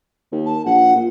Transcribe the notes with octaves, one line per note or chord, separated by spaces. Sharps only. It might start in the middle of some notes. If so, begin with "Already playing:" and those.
D#2
A5
A#1 F#5
A#2